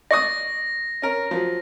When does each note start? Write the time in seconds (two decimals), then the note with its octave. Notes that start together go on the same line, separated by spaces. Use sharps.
0.11 D5 C#6 D#6 A#6
1.02 C#4 A#4
1.31 F3 F#3